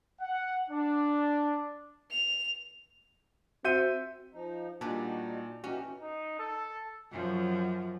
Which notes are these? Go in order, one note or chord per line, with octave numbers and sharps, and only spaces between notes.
F#5
D4
F7
C4 F#4 E5 G5 G#5 G6 D#7
F3 D#4
A#2 G3 D4 D#4 F#4 B4
E3 C#4 D#4 F#4 G4
D#4
A4
F#2 F3